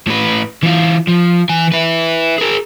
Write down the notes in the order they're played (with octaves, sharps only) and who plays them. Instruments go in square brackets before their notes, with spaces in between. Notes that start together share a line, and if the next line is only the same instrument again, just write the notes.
[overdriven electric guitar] A2 B4
E3 F4
F3
E3 G#5
E4 B4
G#4 A#4